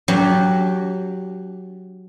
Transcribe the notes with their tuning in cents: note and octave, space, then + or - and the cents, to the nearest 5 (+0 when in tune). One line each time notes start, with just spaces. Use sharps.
F#3 +0 D4 -40 G4 +0